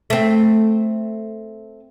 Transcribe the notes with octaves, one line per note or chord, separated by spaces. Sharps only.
A3 C4